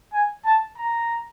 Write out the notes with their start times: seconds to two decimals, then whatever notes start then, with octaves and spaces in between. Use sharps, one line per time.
0.13 G#5
0.45 A5
0.77 A#5